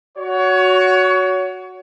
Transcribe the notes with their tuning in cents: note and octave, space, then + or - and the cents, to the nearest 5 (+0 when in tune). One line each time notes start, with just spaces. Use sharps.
F#4 +0 C#5 +25